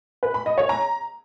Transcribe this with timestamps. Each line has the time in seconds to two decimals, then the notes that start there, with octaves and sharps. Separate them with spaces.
0.23 B4
0.34 B5
0.46 D#5
0.58 C#5
0.69 A#5